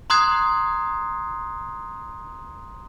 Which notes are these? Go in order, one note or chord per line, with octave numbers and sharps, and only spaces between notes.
A#5 C6 D#6 F#6 G#6 C7